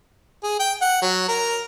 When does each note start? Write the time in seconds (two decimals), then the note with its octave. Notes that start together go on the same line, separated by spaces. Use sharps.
0.43 G#4
0.60 G5
0.82 F#5
1.02 F#3
1.29 A#4